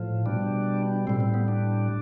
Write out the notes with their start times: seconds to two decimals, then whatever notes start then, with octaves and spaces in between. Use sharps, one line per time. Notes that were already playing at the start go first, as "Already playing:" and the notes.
Already playing: A2 F3
0.26 B2 G3 D4
1.07 A2 G3 C4
1.20 C4
1.34 B3
1.48 D4